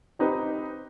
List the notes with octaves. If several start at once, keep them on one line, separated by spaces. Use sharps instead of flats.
C4 D#4 G4 B4